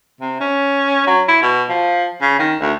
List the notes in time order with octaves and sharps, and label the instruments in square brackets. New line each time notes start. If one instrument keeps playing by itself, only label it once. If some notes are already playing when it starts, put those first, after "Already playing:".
[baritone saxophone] C3
C#4
F#3
E4
B2
F3
C#3
D#3
D2